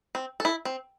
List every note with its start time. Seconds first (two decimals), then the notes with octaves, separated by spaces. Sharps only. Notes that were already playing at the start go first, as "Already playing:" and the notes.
0.15 C4
0.40 E4 A4
0.65 C4